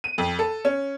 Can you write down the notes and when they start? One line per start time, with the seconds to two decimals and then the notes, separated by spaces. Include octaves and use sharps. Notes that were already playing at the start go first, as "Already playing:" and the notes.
0.04 D#7
0.18 F2
0.39 A4
0.65 C#4